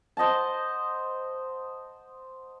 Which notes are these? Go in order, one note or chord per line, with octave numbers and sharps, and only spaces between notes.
C5 D#5 F#5 A5